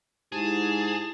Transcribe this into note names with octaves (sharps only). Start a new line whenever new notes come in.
G#2 E4 G4 G#4 A5